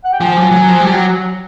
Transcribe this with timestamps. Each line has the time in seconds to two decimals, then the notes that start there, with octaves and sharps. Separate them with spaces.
0.05 F#5
0.13 G5
0.20 F3 G#5
0.37 F#3
0.52 F#3
0.68 F3
0.80 G3
0.92 F#3